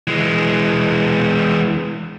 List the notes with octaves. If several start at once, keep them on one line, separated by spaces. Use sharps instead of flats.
E3 G#3